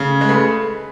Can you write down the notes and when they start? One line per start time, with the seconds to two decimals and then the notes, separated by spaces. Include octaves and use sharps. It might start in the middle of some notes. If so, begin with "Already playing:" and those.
Already playing: C#3 A3
0.21 G#3
0.29 A3 G#4 B4